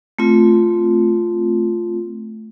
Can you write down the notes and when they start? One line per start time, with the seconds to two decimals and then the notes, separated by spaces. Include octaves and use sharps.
0.19 A3 C4 F4